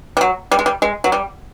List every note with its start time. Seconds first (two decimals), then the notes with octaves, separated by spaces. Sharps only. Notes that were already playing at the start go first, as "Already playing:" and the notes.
0.17 G3
0.21 F#3
0.52 G3
0.59 G#3
0.66 G3
0.82 G#3
1.04 F#3
1.12 G3